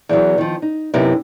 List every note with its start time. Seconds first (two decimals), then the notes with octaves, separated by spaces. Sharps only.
0.09 E2 E3 F#3
0.38 D#3 F3
0.62 D#4
0.94 F#2 C3 B3 D#4 E4